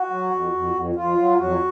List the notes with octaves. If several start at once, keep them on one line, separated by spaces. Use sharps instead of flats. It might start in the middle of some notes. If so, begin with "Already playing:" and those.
Already playing: F#4
F#3
F2
F2
F2
F2 F4
F#3
F2 F#3 F#4